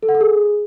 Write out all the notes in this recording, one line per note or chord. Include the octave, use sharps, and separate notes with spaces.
A4
F#5
A4
G#4